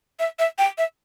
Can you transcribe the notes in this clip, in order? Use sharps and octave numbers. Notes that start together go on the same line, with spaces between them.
E5
E5
G5
E5